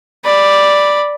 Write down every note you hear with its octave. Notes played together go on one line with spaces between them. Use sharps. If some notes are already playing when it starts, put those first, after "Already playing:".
D5 B5